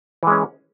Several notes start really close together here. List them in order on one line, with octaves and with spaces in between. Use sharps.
E3 G#3 C#4